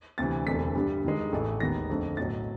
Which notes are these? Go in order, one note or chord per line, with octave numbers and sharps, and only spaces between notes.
D2 C3 E3 A6
E1 D2 C3 E3 A3 B6
G2 D3 G3
G2 D#3 G#3
A1 A2 E3 A3
D#2 D#3 G#3 B3 A#6
F2 D3 F3 A3
B1 A2 F#3 A6